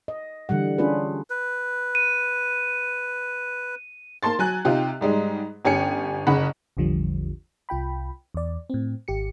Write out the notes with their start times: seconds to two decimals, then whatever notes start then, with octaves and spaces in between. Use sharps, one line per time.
0.08 D#5
0.49 D3 E3 G3 F#5
0.78 C#4 D4 F4 G#4 B4
1.30 B4
1.95 D#7
4.23 A#3 A5 C6 A6
4.39 F#3 G#5 F#6
4.65 C3 D#4 F4 G4
5.01 G#2 G3 G#3
5.65 G1 C#4 G4 G#5 C#7
6.27 F#1 C#3 F#5 B5
6.77 A1 E2 D3 F3 G3
7.69 C2 F4 G5 B5
8.34 E2 D5
8.70 A2 C4
9.08 G#1 G4 C#7